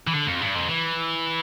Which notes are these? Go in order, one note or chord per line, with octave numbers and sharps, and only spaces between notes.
E3
D3
F2
G2
F2
E3